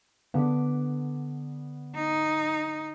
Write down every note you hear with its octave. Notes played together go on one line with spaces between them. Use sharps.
D3 B3 D6 B6
D#4